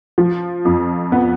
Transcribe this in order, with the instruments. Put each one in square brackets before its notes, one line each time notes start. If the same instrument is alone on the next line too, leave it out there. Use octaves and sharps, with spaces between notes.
[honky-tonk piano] F3
F2
B3